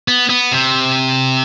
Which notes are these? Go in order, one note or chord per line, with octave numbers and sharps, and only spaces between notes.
B3
B3
C3